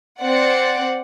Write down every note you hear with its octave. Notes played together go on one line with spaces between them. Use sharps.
C4 D5 F#5